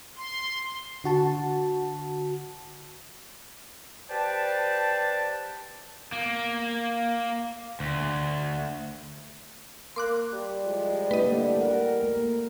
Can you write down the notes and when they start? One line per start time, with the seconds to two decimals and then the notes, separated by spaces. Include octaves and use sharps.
0.17 C6
1.04 D3 F#4 A5
4.09 G4 B4 C5 D5 A5
6.12 A#3
7.80 D2
9.96 A#3 C6 D6 F#6
10.33 G3
10.64 A2 F3 G#3
11.11 D3 A3 A#3 E4 B4 D#5
11.57 A3 A#4 F#5
12.03 A3 A#3